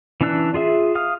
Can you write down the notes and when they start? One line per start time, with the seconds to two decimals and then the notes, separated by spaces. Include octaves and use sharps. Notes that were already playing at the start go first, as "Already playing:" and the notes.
0.21 E3 C#4 D4 E6 F#6
0.54 F4 G#4 E5
0.95 F5 D#6 F6